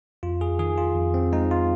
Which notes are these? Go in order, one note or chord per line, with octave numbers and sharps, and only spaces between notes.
F2 F4
G#4
D#3 G#4
F4
F2
C4
G#3 D#4
F4